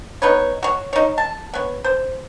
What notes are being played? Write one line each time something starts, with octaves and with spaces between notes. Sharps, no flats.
B3 D#4 B4 C#5
F#4 C#5
D#4 C#5
A5
B3 C#5
C5